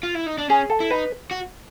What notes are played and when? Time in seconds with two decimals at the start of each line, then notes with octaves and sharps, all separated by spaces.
0.03 F4
0.15 E4
0.26 D#4
0.38 D4
0.49 C#4 G#4
0.70 A4
0.80 E4
0.91 D#4 B4
1.31 F#4